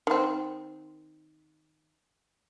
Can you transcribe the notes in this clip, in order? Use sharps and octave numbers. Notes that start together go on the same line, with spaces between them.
D#3 C4